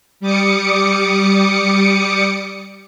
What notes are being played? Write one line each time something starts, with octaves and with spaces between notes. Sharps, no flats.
G3 D6 D#6 C#7